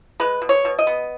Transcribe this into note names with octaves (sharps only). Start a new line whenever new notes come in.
G#3 B4
B2
C#5
B2
D#5
B3